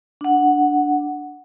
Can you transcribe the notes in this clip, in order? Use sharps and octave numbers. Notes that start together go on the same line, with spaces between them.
D4 F#5